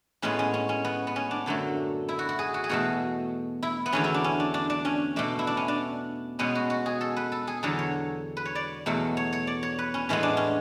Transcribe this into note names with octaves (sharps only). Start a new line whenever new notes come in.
A2 G#3 B3 C#4
C#4
C#4
C#4
B3
B3
C#4
D4
F#2 D3 F#3 A3
E4
F#4
F#4
G#4
F#4
G#4
E2 B2 A3 F#4
E4
B3
E2 D3 F#3 C#4
E4
D4
C#4
D4
D4
D4
C#4
B2 A3 D4
E4
D4
C#4
D4
B2 G#3 B3 C#4
F#4
F#4
G#4
A4
B4
A4
G#4
E2 D3 F#3 A4
C#5
B4
C#5
D5
E2 B2 F#3 A3
C#5
C#5
D5
C#5
B4
C#4
A2 E3 G#3 B3 C#4
D4
C#4